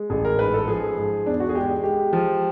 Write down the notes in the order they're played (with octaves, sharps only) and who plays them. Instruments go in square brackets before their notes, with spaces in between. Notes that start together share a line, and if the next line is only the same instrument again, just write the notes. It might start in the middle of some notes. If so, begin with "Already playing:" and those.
Already playing: [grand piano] G#3
A1 G#4
A#4
G#2 B4
A4
F3 G#4
G#2
E2 D4
F#4
G#4
G#3 G4
G#3 G4
F3